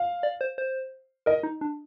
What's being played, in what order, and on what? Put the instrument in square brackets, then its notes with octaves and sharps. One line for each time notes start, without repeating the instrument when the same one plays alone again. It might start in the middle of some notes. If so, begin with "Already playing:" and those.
Already playing: [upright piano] F5
[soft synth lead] D5
C5
C5
[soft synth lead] A#4 [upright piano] D#5
[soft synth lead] D#4
D4